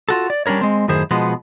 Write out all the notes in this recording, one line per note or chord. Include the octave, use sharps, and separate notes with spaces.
F4 F#4 A4
D5
G3 C#4 D4 A#4 C#5
G#3 C4
F#2 A2 D#3 G#4 C5
B2 F3 G#3 B3